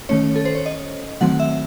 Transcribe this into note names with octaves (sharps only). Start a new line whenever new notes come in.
D#3 A3 C#4 C#5
A4
C5
C#5
D#5
D#3 F#3 A3 C4 F#5
E5